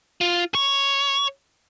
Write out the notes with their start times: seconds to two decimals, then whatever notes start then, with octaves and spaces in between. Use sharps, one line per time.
0.21 F4
0.55 C#5